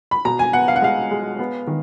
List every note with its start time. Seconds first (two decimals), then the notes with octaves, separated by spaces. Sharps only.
0.11 B5
0.25 B2 A#5
0.39 G#5
0.53 B3 F#5
0.68 F5
0.76 F#5
0.82 G#3 F5
1.11 G#3
1.39 B3
1.67 D#3